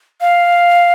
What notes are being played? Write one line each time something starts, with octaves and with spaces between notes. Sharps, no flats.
F5